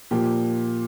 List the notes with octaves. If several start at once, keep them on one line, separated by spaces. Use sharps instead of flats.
A#2 F3 A#3 G4